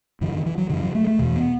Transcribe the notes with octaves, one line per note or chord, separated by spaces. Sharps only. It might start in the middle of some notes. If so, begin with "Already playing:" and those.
F#2 C#3 E3
D#3
E3
F#3
F#2 C#3 E3
F#3
A3
A3
E2 B2 E3
B3